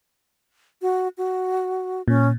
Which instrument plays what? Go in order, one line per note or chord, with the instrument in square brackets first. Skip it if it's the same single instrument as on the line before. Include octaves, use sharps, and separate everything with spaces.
[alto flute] F#4
F#4
[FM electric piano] A#2 [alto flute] C#4